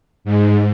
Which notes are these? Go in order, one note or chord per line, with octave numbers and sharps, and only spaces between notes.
G#2